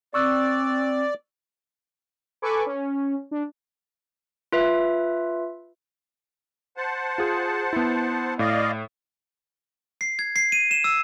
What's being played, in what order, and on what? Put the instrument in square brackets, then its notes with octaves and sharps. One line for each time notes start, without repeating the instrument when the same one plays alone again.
[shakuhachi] C4 [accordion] D5 [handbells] C#6 E6 F#6
[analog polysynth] A4 B4 G#5 B5 C#6 D6
C#4
D4
[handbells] F4 B4 E5
[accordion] C5 F#5 A5
[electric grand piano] F4 G#4
B3 E4
[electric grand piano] A2 [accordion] D5 D#5 F5
[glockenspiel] C7
G#6
C7
D#7
E7
E6